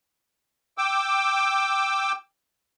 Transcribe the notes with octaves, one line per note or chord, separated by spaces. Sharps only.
G5 D6 E6